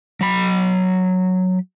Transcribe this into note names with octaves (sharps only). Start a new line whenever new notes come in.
F#3 B5